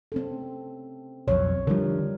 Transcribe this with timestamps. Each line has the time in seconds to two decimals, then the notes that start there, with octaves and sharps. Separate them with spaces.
0.12 C4 C#4 A4
1.28 B1 F2 C#5
1.67 D3 D#3 F3 G3 A#4